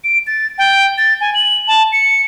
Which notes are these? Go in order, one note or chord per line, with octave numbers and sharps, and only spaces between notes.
D7
A6
G5
A6
G#5
F#7
A5
C#7